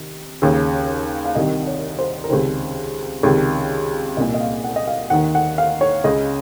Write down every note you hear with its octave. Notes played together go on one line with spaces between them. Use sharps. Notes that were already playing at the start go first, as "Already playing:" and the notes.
Already playing: C3 D#3
D#2 C#3
F5
C2 C3 D#3 D#5
C#5
C5
A#4
C#2 C3 D#3 C5
C#2 C3 D#3
C2 A#2 D#5
D#5
F5
F#5
D#5
F5
D#2 D#3 F#5
F#5
F5
C#5
C#2 C#3 D#5